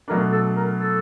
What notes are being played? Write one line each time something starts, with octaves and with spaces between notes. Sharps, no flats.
B2 F#3 A3 D4 A#4
A4
A#4
A4